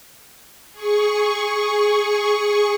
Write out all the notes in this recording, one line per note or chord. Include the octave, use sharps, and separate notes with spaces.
G#4 C#6